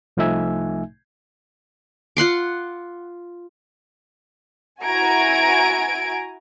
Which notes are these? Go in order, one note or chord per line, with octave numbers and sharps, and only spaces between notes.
C2 F3 A3 D#4 E5 G#5
F4 F#5 C6 D6
E4 F#4 G#5 A#5 G#6 D7